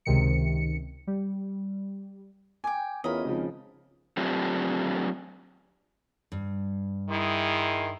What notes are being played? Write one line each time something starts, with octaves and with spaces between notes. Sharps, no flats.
C#2 C3 D#3 C#7
G3
G5 G#5 D6
E2 C#4 F4 A#4 D#5 B5
G#1 C#3 F3
F#3 A3 C4 D4 F4 G4
G2
D#3 E4 G#4 C6